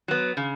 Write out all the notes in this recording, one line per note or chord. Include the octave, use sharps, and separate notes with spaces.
F#3 B3
C#3